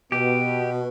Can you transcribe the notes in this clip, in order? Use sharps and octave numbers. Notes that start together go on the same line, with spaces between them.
B2 G4